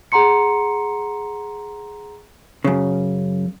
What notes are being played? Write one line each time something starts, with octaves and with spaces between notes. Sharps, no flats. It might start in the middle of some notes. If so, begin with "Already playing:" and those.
G#4 F#5 A#5 C6 C#7
F#2 C#3